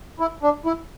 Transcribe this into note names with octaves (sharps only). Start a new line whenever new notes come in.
E4
D4
E4